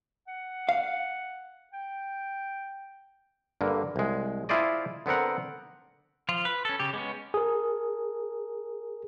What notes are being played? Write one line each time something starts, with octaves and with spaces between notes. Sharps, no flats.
F#5
F5
G5
G2 D3 A#3
C2 G#3
E4 F4 G#4 C5 D5 D#5
D3 B3 C4 A#4 F#5
F3 F4
B4
C#4 A4
C#3 G4
G#3 B3 C#4
G#4 A#4